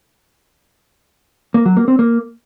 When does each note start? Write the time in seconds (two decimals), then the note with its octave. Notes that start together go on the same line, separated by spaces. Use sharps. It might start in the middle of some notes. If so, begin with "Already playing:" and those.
1.54 A#3
1.66 F#3
1.77 A#3
1.88 C4
1.99 A#3